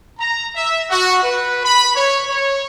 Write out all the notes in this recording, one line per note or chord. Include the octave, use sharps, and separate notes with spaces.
A#5
E5
F#4
B4
B5
C#5
C#5